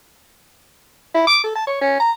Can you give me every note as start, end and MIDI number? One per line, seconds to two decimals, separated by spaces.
1.14 1.24 64
1.27 1.39 86
1.44 1.53 69
1.55 1.67 81
1.67 1.80 73
1.81 1.99 61
2.00 2.11 82